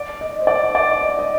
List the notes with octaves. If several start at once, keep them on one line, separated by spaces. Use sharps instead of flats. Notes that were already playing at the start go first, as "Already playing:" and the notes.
Already playing: D5
D#5
C5
D5
D5
D#5
D#5